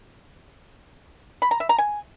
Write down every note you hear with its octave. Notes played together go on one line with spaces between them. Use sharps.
B5
A#5
E5
A#5
G#5